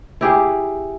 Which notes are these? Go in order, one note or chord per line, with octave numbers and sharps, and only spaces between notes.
E4 G4 G#4